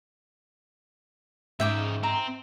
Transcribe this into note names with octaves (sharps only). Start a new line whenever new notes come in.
G#2 C#3 D#4 E5 G5 D6
C4 A#5